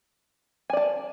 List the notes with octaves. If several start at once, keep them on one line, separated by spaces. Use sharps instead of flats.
D5 G#5 A5